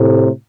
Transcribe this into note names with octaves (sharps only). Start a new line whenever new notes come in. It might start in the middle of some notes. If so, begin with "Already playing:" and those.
Already playing: A2 C3